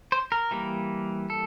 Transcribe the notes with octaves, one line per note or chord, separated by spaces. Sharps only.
C5
A#4
E3 G3 A#3
A4